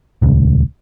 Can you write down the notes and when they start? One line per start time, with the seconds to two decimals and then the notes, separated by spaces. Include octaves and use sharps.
0.22 D#1 C#2